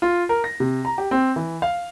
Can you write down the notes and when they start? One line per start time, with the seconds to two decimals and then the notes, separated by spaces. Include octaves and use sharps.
0.02 F4
0.29 A#4
0.44 A#6
0.60 C3
0.85 A#5
0.98 G4
1.11 C4
1.36 E3
1.62 F5